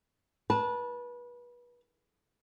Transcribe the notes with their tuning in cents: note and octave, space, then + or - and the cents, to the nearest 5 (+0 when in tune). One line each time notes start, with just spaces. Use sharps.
B4 -30 A5 -5